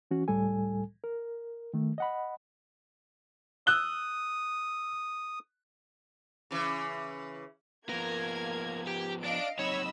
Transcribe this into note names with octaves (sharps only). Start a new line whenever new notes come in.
E3 C#4 F#4
C#2 A2 G3 A4 G#5
A#4
D#3 A3
D#5 F#5 B5
D#6 E6 F#6 G7
C#3 E3
F3 A#3 B3 A#4 G#6
G4
D4 D5 D#5 F5 D7
F#3 C4 D#4 C#5 D#5 B5 E6